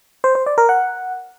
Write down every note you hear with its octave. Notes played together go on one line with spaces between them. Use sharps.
C5
C5
D5
A#4
F#5